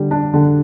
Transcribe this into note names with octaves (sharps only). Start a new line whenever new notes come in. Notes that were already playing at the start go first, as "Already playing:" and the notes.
Already playing: D3 G3
D4
D3